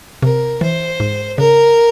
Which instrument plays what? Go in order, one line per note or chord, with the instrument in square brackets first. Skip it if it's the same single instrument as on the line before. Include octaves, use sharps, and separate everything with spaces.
[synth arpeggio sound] C3 [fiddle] A#4
[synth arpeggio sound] E3 [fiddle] C5
[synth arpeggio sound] G#2
[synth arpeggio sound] C#3 [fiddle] A#4